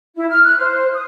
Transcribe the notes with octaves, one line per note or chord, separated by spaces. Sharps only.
E4
F6
F#6
C5
D#6